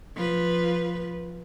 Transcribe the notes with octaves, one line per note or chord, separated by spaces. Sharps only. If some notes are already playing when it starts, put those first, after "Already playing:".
F3 B4